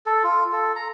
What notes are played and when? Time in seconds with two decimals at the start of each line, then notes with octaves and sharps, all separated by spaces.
0.06 A4
0.24 F4
0.52 A4
0.76 A#5